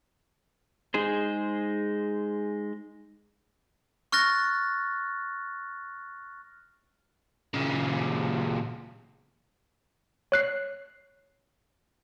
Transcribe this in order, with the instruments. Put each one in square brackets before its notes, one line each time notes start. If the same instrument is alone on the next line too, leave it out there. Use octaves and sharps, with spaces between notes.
[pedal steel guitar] G#3 D#4 G#4 C5
[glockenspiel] C#6 F6 F#6 A6 A#6
[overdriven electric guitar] A#2 C#3
[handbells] C#5 F#6 C7